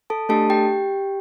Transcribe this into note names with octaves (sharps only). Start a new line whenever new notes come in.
A4 A5
A3 D4 G4 A4 A5
G4 G5